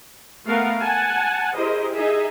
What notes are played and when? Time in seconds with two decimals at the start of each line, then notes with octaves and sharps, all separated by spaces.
0.46 A3 B3 A#4 F5 F#5
0.80 F#5 G#5 A5
1.55 E4 G4 G#4 A#4 C5 D#5
1.94 D#4 G#4 D#5 E5